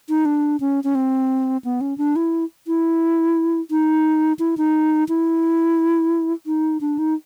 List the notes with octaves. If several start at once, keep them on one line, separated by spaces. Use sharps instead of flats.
D#4
D4
C#4
C#4
C4
B3
C#4
D4
E4
E4
D#4
E4
D#4
E4
D#4
D4
D#4